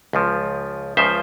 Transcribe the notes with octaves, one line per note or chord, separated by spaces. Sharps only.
C#2 C#3 F3
C#2 C#3 F3 C5 E5